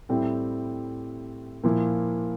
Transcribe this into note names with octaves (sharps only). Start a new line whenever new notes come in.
A2 G3 C4 E4
A#2 F3 A#3 E4